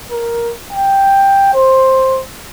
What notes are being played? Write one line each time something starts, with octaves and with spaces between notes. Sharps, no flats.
A#4
G5
C5